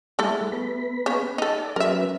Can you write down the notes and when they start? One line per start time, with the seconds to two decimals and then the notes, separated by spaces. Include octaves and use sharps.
0.19 G3 A3 E4 G#4 A4
0.52 B3 B5
1.06 C#3 C#5
1.38 D#4 A4
1.58 D5 A5
1.76 F#3 C#4 A#4 B4 E5